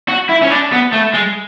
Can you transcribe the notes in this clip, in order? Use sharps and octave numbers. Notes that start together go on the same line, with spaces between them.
F#4
E4
C#4
D4
B3
A3
G#3